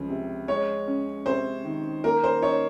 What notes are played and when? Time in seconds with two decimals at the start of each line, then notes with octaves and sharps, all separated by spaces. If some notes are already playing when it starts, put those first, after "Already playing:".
Already playing: C#2 F3 G#3
0.09 C3
0.48 G#3 C#5
0.87 C#4
1.26 C3 C5
1.64 D#3
2.04 A#3 A#4
2.24 C5
2.42 D#4 C#5